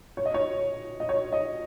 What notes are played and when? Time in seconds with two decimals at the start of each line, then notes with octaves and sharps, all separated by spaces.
0.17 C#5
0.26 D#5
0.34 C#5
1.00 D#5
1.09 C#5
1.32 D#5